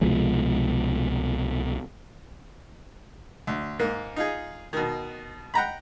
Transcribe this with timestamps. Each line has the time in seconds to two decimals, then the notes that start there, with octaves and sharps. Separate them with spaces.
0.01 C2 B2 F3 G#3
3.47 D2
3.79 G#2 A#3
4.16 D#4 F4 G#4
4.73 B2 D#3
5.54 F#5 G5 A#5 B5